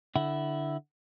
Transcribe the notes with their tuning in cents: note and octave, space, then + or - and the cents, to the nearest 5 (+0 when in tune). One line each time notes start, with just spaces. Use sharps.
D3 +0 E4 +0 F#5 +25